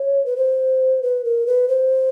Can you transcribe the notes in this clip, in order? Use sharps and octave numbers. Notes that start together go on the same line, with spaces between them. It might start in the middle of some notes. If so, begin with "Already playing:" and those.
Already playing: C#5
B4
C5
B4
A#4
B4
C5